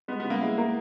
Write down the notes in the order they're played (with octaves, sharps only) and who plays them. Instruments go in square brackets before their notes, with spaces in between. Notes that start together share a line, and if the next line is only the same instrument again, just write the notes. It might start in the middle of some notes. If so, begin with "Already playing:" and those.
[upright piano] G#3 [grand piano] B3
[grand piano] B3
[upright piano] C#3
[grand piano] A#3
[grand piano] G#3 [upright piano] E4
[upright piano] A#3